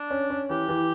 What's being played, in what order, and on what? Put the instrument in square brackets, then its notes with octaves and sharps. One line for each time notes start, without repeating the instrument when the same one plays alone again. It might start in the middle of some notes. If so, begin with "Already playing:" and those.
Already playing: [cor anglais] D4
[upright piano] C#4
C#4
[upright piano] E3 [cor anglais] G4
[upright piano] E3